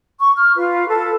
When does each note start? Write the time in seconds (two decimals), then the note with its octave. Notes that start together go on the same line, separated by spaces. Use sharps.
0.20 C#6
0.37 F6
0.56 F4 B4
0.88 A4 B4